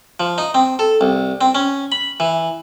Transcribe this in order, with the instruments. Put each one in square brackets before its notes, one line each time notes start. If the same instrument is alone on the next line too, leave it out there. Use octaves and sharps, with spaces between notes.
[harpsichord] F3
D#4
C4
A4
C2
C4
C#4
B5
E3